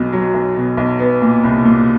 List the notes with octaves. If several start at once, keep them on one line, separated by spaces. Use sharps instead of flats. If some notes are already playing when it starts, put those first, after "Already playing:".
Already playing: B1 B2 F#3
F#3
B1
B2
B1
B3
A#2
C2
A#2